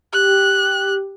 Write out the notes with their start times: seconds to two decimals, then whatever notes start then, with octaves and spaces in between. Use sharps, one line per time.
0.13 G4 F#6